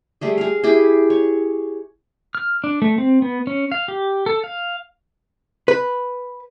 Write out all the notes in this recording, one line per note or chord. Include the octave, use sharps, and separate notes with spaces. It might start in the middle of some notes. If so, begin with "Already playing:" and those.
G3 A3 G#4
G#4 F5
E4 G4 G#4
C#5
F6
D4
A3
C4
B3
C#4
F5
G4
A4
F5
B4